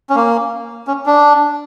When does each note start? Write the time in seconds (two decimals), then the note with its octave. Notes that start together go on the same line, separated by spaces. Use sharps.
0.10 C#4
0.15 A#3
0.87 C#4
1.06 D4